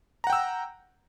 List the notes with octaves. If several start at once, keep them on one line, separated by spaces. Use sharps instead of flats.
F#5 G5 A#5 E6